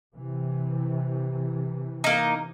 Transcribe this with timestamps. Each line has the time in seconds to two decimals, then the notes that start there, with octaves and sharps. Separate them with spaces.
0.15 C3 E3
2.04 A#3 D#4